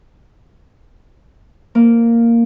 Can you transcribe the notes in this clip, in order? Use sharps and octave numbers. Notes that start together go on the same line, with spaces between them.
A#3